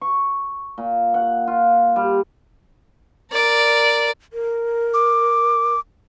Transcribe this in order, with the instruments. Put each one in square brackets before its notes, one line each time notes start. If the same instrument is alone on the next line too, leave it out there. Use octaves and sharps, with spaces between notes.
[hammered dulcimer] C#6
A#2
F#5
F4
G3
[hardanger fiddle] A#4 D5
[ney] A#4
[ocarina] D6